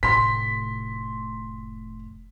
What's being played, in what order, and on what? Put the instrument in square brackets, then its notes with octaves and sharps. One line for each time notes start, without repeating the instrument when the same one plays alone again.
[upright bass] F1 A2 [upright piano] C6 B6